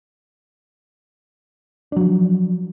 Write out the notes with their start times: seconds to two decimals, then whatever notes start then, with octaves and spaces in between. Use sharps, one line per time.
1.92 D4
1.96 F#3
2.01 F3